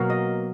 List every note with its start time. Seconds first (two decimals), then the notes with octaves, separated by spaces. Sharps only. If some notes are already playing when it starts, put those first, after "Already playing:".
Already playing: B2 F#3 A#3 F5
0.10 D#5